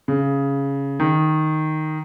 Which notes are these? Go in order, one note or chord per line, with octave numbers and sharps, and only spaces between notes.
C#3
D#3